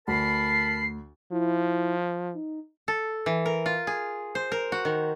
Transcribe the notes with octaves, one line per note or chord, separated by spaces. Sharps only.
D2 A#4 A5 B5 C7
F3 E4
D#4
A4
E3
A#4
F4
G#4
C5
A#4
F#4
D#3